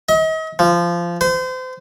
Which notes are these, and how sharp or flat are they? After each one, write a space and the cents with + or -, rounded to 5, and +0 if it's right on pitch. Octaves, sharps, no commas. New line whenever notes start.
D#5 +40
F3 -15
C5 -35